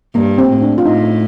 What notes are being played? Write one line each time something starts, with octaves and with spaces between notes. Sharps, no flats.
G2 A#3
C4
A2
D4
F4
A2 D#4